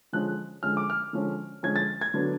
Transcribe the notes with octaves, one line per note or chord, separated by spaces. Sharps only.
D3 F3 G#3 C#4 F#6
D3 F3 G#3 C#4 F6
D6
F6
D3 F3 G#3 C#4
D3 F3 G#3 C#4 G#6
A6
G#6
D3 F#3 B3 D4